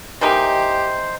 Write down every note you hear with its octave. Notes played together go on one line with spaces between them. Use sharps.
E3 A#3 D#4 G4 C5